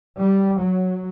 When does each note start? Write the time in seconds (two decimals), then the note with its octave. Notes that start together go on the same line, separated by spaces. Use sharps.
0.19 G3
0.60 F#3